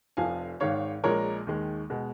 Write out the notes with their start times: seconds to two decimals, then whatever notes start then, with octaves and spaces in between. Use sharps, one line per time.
0.17 F1 F2 F3 F5 G#5
0.60 G#1 G#2 D#3 C#5 F5
1.04 A#1 A#2 G#3 A#4 C#5
1.47 D#2 D#3 G#3
1.90 B2 G#3